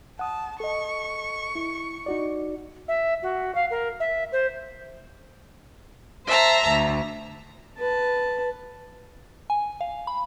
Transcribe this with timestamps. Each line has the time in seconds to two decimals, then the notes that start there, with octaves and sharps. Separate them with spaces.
0.19 F#5 A5 D#6
0.60 A4 D#5 C#6
1.55 E4
2.06 D#4 F#4 D5
2.88 E5
3.23 F#4
3.55 F5
3.71 A#4
4.00 E5
4.32 C5
6.26 C5 E5 A5 A#5
6.68 D2
7.78 B4 A5
9.50 G#5
9.81 F5
10.07 B5